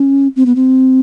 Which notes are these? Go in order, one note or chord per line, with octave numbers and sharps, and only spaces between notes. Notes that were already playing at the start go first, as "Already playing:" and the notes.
Already playing: C#4
C4
B3
C4